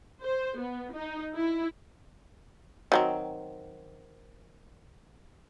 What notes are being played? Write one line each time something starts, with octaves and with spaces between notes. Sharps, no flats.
C5
B3
D#4
E4
D#3 F#3 C4